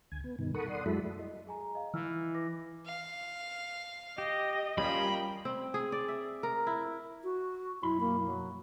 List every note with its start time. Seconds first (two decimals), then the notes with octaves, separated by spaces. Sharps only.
0.12 D2 G#5
0.24 B3
0.39 G2 B2 D#3
0.54 A4 A#4 F#5 B5 C#6 D#6
0.67 D5 F#5 C6 D#6
0.86 F#2 F#3 G#3 E4 A4 B5
1.19 D#5
1.47 G#4 G#5 A#5
1.75 D#5 F5
1.94 E3 E6 F6
2.35 B4 D6 A#6
2.86 F5
4.18 G4 D#5
4.78 G3 A#3 C#4 F4 G5 B5
5.45 C4
5.74 G#4
5.92 D5
6.08 E5
6.43 A#4
6.67 E4
7.24 F#4
7.83 B1 F#2 E4 B5
8.00 A#3
8.25 F#3